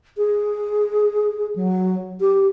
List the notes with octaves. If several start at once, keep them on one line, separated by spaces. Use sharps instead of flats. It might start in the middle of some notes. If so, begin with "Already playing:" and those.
G#4
F#3
G4